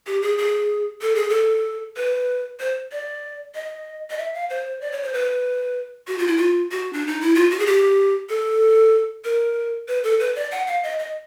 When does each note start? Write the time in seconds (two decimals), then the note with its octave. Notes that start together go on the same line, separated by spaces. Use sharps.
0.07 G4
0.22 G#4
0.38 G#4
1.01 A4
1.15 G#4
1.29 A4
1.97 B4
2.60 C5
2.92 D5
3.55 D#5
4.10 D#5
4.18 E5
4.34 F5
4.50 C5
4.81 D5
4.92 C#5
5.03 C5
5.13 B4
6.08 F#4
6.18 F4
6.27 E4
6.37 F4
6.71 F#4
6.93 D4
7.07 D#4
7.21 E4
7.35 F4
7.51 F#4
7.59 G#4
7.66 G4
8.29 A4
9.25 A#4
9.88 B4
10.04 A4
10.20 B4
10.35 D5
10.51 F#5
10.67 F5
10.83 D#5
10.99 D#5